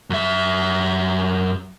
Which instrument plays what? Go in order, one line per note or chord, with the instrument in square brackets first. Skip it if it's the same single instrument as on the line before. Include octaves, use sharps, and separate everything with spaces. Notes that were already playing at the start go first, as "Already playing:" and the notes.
[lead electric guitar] F#2 E5